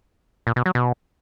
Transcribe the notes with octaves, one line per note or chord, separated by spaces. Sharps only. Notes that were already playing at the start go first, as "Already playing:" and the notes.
A#2
B2
F#3
B2